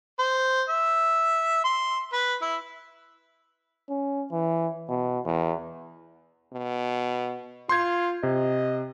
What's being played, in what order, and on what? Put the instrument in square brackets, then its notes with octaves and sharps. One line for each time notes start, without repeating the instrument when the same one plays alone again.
[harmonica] C5
E5
C6
B4
E4
[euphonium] C#4
E3
B2
E2
[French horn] B2
[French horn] F4 [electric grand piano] C6 G6 G#6
[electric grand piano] C3 [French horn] D#5